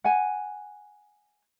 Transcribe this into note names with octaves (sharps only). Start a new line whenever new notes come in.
F#5 G#5